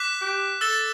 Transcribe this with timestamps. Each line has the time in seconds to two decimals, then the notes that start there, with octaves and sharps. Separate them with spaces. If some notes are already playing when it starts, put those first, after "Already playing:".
Already playing: D6 F#6 B6
0.21 G4
0.61 A4 E6 A6 E7 G7